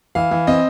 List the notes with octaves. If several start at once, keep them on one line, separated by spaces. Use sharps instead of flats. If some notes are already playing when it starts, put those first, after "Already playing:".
E3 F5
E3
C4 D#5